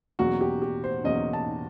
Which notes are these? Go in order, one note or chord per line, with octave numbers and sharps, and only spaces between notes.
E2 B2 F#3 A#3 C#4 F#4
G4
G4
C5
E2 B2 F#3 A#3 C#4 D#5
A5